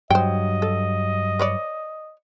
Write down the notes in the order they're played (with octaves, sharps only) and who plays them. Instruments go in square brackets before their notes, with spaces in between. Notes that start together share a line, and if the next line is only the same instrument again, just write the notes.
[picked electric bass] G2 F#3 [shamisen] C5 G5 [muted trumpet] D#5
[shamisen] A4
B4 C#5 D5